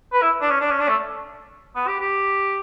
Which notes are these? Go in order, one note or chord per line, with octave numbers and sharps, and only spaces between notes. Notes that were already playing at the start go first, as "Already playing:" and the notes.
B4
E4
D4
C#4
D4
C#4
D4
A3
B3
G4
G4